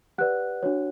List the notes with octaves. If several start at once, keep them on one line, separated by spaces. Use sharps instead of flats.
G4 B4 D5 F#5 F#6
D4 F#4 C#5